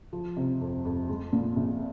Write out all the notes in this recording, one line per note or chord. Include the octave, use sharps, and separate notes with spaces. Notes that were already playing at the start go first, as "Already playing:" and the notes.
F3
C3
F2
F2
G#3
A#2
A#1